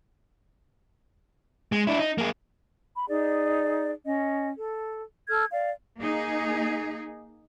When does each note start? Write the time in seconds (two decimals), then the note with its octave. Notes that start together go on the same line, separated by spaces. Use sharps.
1.72 G#3
1.87 D4 E4
1.99 D#4
2.18 A#3 G#4
2.96 B5
3.08 D#4 G#4 D5
4.05 C#4 D#5
4.56 A4
5.29 A4 F6 G#6
5.52 D5 F5
5.99 A#3 D#4 G#4